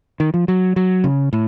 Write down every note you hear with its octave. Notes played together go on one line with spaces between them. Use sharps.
D#3
F3
F#3
F#3
C#3
A2